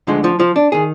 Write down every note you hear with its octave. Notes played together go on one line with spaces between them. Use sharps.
D2 D3 F3 G#3
F3
F3
D4
D#3 G#4